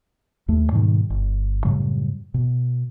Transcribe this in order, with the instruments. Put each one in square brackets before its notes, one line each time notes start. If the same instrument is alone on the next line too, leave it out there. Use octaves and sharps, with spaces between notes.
[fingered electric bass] D#2 A3
G#2 B2 D#3 G3
G1
F#2 A2 C#3 G3
B2